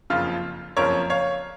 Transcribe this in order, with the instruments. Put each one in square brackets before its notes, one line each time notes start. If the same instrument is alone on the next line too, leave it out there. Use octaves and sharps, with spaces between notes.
[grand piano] F#1 F2 C#3 F3 F4
F#1 F2 C#3 F3 A#4 C#5
C#5 F5